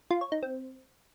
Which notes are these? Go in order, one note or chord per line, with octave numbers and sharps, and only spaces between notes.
F4
C#5
D#4
C4